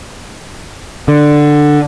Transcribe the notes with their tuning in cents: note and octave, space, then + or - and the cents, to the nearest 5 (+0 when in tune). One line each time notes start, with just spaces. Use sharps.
D3 +10